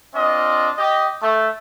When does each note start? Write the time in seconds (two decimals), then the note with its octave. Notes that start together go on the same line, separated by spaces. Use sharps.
0.15 C4 D4 F4 D#5
0.78 G4 D#5
1.21 A3